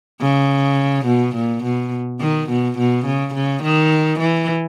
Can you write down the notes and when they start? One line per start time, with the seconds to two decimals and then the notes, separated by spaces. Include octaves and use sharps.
0.21 C#3
1.06 B2
1.35 A#2
1.64 B2
2.20 D#3
2.50 B2
2.78 B2
3.06 C#3
3.34 C#3
3.63 D#3
4.20 E3